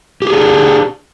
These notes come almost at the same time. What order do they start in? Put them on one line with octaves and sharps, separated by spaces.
G4 G#4 D4